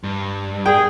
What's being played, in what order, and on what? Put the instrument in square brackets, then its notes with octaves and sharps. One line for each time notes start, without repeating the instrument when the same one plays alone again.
[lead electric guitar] G2
[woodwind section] G#4 [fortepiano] G5